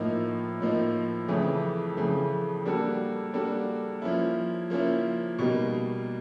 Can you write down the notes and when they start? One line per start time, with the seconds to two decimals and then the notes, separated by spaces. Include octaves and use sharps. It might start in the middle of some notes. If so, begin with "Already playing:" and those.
Already playing: A2 F3 A#3 D#4
0.61 A2 F3 A#3 D#4
1.28 F2 C#3 E3 A3
1.97 F2 C#3 E3 A3
2.65 G3 A#3 D4 F#4 A4
3.33 G3 A#3 D4 F#4 A4
4.02 F3 A#3 C#4 E4
4.70 F3 A#3 C#4 E4
5.39 B2 G3 A#3 D#4